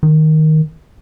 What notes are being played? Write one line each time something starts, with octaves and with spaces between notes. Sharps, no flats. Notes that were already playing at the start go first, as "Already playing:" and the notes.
D#3